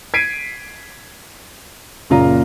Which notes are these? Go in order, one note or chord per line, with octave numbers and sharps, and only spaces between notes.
G#6 B6 C7 D7 D#7
F#1 A#2 C#3 F4 A#5